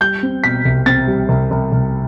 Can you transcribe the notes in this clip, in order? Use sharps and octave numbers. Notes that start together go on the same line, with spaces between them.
G3 G6
C4
B2 B6
C2
C4 A6
G3
C2
C2
C2